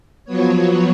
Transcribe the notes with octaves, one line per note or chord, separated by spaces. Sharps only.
F3 F#3 B3 C#5